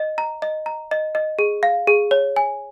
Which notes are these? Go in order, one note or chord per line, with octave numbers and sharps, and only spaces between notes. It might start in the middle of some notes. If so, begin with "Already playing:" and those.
Already playing: D#5
A#5
D#5
A#5
D#5
D#5
G#4
F5
G#4
C#5
G#5